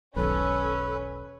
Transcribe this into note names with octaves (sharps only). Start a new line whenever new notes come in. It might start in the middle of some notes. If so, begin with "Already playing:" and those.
E1 B1 D#3 C#4 A4 B4